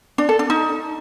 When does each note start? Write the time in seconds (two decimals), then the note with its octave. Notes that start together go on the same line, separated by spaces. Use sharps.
0.18 D4
0.29 A4
0.39 D4
0.50 D#4